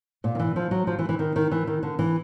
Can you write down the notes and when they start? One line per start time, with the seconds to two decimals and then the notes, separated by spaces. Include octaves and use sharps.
0.24 A#2
0.35 D#3
0.40 E3
0.56 F3
0.71 F#3
0.87 F3
0.99 E3
1.09 E3
1.19 D#3
1.36 D#3
1.51 E3
1.67 D#3
1.83 D3
1.99 E3